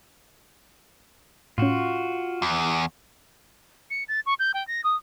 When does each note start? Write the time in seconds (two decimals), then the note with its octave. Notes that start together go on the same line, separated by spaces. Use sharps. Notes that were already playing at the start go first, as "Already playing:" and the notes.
1.58 A2 C#4 F4 F#4
2.42 E2
3.90 C#7
4.08 A6
4.26 C#6
4.39 G6
4.54 G5
4.67 A#6
4.84 D#6